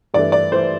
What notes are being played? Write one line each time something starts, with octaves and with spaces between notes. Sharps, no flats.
G2 E3 A3 D5
D5
E3 A3 C5